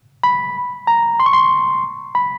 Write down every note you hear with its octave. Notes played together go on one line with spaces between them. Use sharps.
B5
A#5
C6
C#6
C6
B5